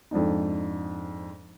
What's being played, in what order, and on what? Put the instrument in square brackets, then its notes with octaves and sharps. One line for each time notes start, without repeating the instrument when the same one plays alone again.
[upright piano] F2 G#2 D4 D#4